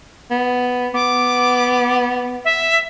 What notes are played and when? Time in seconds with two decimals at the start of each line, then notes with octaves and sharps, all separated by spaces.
0.31 B3
0.94 B3 D6
2.45 E5